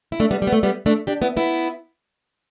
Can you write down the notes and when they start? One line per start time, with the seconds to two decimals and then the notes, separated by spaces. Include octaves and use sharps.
0.12 E4
0.20 A3 D4
0.31 G3 B3
0.42 G3
0.47 B3
0.53 A3
0.63 G3 B3
0.86 A3 D4
1.07 D4 G4
1.22 B3 E4
1.37 B3 E4